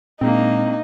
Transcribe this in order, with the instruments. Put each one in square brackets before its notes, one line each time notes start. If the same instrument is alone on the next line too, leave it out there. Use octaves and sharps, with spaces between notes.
[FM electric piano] A#2 G#3 [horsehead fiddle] A#3 D4 [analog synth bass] C4 [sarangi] D#4